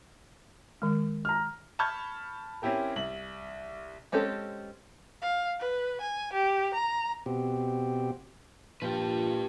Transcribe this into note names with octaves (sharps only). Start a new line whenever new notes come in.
D#3 G#3
A#5 F6
A5 B5 C#6 F6 G6 G#6
C4 C#4 E4 G4 A#4
C2 F#7
G#3 C4 C#4 G4 A4
F5
B4
G#5
G4
A#5
B2 C4 G4
A#2 F3 G4 B4